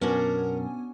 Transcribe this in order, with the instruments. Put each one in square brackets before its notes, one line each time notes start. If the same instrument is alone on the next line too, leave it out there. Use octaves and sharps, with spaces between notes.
[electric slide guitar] F#2 B2 [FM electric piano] B3 G#5 [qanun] C#4 D4 F#4 [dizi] A#4